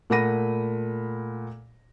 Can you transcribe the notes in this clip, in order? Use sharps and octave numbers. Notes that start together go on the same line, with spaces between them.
A#2 A3 F#5 B5 A#6 D#7